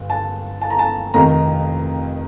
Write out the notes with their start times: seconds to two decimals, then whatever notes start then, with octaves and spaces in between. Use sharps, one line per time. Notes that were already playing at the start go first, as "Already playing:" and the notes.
Already playing: G1
0.10 A5
0.62 A5
0.70 A#5
0.79 A5
1.14 F1 F2 D#3 A#5